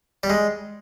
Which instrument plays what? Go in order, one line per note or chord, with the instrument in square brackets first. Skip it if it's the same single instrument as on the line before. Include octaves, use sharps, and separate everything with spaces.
[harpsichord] G3
G#3